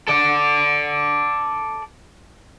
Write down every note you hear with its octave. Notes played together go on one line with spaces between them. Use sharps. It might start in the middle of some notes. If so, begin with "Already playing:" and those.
A4 D5